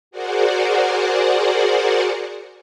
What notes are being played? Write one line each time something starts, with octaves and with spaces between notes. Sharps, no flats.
F#4 G#4 A#4 C5 D5 F#5